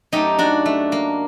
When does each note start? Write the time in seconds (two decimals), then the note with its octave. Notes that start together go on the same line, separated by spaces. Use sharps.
0.13 F#2 F#3 A3 D#4 G4
0.39 D4 F#4
0.66 A3
0.92 A#3